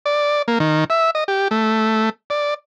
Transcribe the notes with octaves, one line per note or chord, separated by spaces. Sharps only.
D5
A#3
D#3
E5
D#5
G4
A3
D5